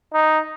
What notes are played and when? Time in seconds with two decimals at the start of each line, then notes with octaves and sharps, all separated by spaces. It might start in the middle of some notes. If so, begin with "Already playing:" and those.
0.14 D#4